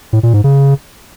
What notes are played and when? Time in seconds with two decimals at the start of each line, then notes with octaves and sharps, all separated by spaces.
0.13 A2
0.23 A#2
0.34 G#2
0.44 C#3